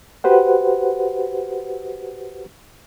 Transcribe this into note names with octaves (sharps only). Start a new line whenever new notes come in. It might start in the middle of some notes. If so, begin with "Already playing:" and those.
F#4 G4 B4 C5 F#5